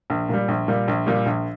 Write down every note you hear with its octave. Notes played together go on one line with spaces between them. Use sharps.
A#1
A#2 G3
A#1
A#2 G3
A#1
A#2 G3
A#1